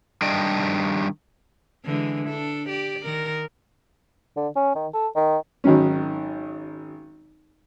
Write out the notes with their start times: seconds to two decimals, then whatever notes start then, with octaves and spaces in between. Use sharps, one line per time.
0.22 D#3 G3 D4 D#5 G5
1.85 D3 E3 G#3
2.28 D4 A4
2.69 G4 D5
3.05 D#3 A#4
4.37 D3
4.56 C#4
4.76 D#3
4.94 A4
5.16 D#3
5.64 G#1 D#3 F#3 C#4